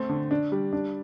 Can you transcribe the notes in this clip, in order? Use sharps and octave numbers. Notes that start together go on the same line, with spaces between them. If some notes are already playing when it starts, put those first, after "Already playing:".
Already playing: A3 C4
D3
D4
G3
D4